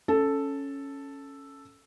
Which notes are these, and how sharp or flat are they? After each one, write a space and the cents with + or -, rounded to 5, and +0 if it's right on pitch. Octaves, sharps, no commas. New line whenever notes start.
C#4 +0 A4 +0